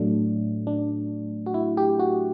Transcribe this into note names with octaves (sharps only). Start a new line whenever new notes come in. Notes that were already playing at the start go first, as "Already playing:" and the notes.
Already playing: A2 F#3 A3 D4
D4
F#4
E4
G4
F#4